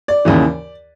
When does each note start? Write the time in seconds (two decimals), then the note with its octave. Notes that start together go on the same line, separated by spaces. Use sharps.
0.08 D5
0.25 D#2 C#3 E3